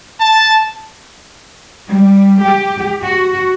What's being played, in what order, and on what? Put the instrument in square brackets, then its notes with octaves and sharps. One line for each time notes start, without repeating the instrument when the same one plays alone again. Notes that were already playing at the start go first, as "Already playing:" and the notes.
[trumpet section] A5
[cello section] G3
G4
F#4